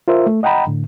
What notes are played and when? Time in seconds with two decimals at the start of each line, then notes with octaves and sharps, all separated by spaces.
0.08 F4 A#4 C5 E5
0.27 A3
0.43 D#5 F#5 G5 A#5 B5
0.67 A2 D3